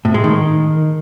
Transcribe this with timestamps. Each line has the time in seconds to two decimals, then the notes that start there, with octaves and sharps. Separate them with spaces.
0.05 A2
0.14 G#3
0.24 D#3